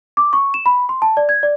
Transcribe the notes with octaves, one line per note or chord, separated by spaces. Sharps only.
D6
C#6
E7
B5
C6
A5
D5
G#6
D5